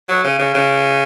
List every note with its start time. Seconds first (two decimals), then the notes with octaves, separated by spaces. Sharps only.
0.09 F#3
0.24 C#3
0.39 C#3
0.54 C#3